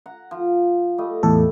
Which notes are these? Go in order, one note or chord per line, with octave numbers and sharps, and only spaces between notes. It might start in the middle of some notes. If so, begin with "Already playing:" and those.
F#5 A#5
F3
G3 A3 D#5
E2 A2 A4